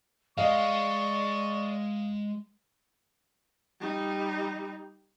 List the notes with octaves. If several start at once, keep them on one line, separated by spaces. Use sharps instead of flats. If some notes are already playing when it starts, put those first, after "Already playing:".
G#3 D5 D#5 F5 C#6
G3 D#4